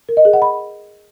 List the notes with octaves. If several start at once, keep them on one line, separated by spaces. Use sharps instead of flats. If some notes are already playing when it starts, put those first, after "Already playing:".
A#4
D#5
G#4
F#5
B5